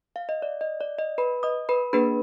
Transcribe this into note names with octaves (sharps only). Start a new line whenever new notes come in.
F5
D#5
D5
D#5
D5
D#5
B4 B5
D#5 D#6
B4 B5
A#3 D4 G#4 B4 B5